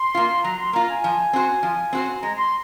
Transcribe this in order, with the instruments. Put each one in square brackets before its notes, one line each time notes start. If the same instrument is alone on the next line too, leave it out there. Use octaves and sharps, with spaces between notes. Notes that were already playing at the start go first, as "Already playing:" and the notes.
Already playing: [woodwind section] C6
[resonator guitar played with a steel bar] A#3 F4
[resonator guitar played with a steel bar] F#3 [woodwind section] A#5
[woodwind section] C6
[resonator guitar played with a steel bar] A#3 F4 [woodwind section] A#5
[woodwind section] G#5
[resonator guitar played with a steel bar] F3
C4 F#4 C5
F3
C4 F#4 C5
[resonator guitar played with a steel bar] G#3 [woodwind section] A#5
[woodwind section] C6